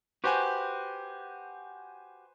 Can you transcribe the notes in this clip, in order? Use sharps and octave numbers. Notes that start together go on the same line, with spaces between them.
F#4 G4 B4 C5 G#5